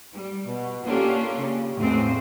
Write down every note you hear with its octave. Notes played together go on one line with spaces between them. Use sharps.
G3
B2
A#3 C#4 D4 F4 G4 A4
C#3
E2 A2 C#3 G#3 C4 C5